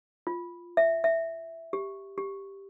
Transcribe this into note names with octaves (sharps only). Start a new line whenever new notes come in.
F4
E5
E5
G4
G4